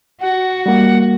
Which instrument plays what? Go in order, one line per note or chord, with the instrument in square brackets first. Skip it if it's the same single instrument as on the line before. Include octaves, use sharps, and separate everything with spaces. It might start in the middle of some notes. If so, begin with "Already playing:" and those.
[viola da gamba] F#4 [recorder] F#5
[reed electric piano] G3 A#3 [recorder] F#5